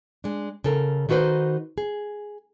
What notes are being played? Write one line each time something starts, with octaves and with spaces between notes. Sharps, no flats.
G#3 D4
C#3 A4 A#4
D#3 D#4 F#4 B4 C5
G#4